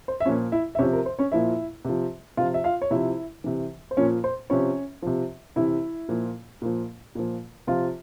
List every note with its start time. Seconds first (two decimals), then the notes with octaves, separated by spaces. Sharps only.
0.08 C5
0.20 E5
0.25 A#2 F3 C#4 C#5
0.52 E4 E5
0.75 E5
0.79 C3 F3 C#4 C#5
0.93 A#4
1.06 C5
1.19 C#4 C#5
1.32 A#2 F3 E4 E5
1.85 C3 F3
2.37 C3 F3 F4 F5
2.54 E5
2.64 F4 F5
2.82 C#5
2.91 C3 F3 E4 E5
3.44 C3 E3
3.91 C5
3.97 A#2 F3 C#4 C#5
4.24 C5
4.50 C3 F3 C#4 C#5
5.02 C3 F3
5.56 C3 E3 E4 E5
6.09 A#2 F3
6.62 A#2 F3
7.15 A#2 F3
7.67 C3 F3 F4 F5